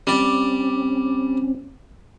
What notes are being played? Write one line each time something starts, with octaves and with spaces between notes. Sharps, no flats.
G3 C4 C#4 D5